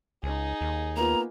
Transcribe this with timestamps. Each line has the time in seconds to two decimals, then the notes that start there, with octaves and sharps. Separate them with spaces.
0.23 C#2 D#4 G#4
0.61 D#2
0.96 A#3 B3 F4 A#5